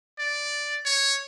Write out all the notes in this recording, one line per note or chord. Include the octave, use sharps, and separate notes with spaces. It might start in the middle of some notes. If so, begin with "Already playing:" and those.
D5
C#5